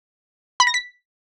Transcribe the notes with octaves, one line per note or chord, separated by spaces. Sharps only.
B5
A#6
B6